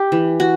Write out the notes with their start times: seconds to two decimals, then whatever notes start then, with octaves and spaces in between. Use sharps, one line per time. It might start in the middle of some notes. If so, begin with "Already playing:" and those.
Already playing: G4
0.12 E3
0.40 F#4